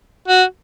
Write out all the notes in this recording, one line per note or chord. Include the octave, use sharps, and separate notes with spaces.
F#4